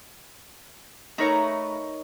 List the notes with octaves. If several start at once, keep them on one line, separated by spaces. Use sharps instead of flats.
A3 D#4 A#4 B4 C#5 A#5